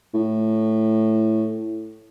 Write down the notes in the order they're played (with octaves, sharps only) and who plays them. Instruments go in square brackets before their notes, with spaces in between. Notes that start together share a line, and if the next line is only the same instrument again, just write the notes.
[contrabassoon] A2